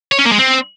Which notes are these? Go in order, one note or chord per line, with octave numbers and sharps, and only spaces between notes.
C#5
C#4
A#3
G#3
C4